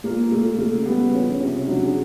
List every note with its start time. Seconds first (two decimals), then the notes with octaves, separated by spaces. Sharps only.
0.04 A#2 A#3
0.31 A#2 A3
0.58 C#3 A3
0.86 G3 B3
1.14 F3 C#4
1.40 C3 C#4
1.67 F#3 D4
1.84 G#4